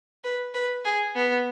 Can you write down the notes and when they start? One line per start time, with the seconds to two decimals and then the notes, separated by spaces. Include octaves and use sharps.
0.24 B4
0.54 B4
0.85 G#4
1.16 B3